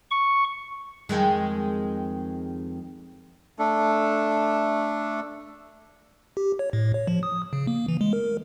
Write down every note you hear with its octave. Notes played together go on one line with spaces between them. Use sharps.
C#6
F2 D#3 G#3
A3 D4 A4
G4
C#5
A2
C#5
F3
D#6
C#3
A#3
E3
G#3
A#4